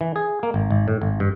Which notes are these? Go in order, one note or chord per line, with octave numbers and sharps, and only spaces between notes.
E3
G#4
A#3
G#1
G#1
A2
G#1
G2